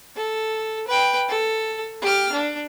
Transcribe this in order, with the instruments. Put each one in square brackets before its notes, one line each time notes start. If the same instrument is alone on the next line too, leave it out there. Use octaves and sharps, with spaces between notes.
[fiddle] A4
B4 G5
A4
G4 F6
D4